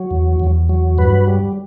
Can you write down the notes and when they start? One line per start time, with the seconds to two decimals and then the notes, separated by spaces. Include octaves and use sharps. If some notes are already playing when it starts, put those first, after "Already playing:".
Already playing: F#3
0.11 E2
0.40 E2
0.69 F#3
0.98 G2 B4
1.27 G3